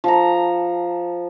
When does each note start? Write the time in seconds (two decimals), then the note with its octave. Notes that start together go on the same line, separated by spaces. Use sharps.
0.04 F3 A4 A#5